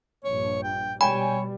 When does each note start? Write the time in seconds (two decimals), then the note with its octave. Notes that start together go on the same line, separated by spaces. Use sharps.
0.24 A#1 G2 C#5
0.64 G5
1.01 B2 G3 C#5 G5 G#5 B5